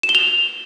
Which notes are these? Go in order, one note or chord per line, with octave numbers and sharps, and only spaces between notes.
E7
G7
F7